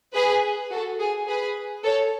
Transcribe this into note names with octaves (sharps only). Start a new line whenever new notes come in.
G#4 B4
F#4 A4
G#4
G#4 B4
A4 C#5